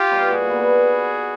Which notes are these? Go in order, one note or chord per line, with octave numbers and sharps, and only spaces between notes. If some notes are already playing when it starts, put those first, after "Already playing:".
Already playing: F4 G4
G3 B3 D#4
A#2 F#4 G#4
G3 B3 D#4